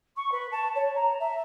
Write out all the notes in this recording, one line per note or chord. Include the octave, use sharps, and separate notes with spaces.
C#6
B4
A5
C#5
A#5
E5